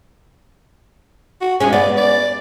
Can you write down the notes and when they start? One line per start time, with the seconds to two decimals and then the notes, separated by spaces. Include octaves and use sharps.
1.41 F#4
1.60 G2 G#3 C#4 G#4
1.73 B3 D5
1.97 D5